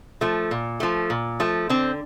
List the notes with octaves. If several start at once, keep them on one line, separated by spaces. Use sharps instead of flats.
F3 A3
A#2
F3 A3
A#2
F3 A3
D3 C4